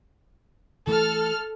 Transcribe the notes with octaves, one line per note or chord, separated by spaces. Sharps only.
E3 A3 A4 F6